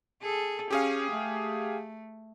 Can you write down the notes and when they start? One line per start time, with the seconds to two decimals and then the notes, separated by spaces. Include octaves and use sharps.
0.22 G#4 A4
0.71 C#4 G4 G#4 F5
1.11 A3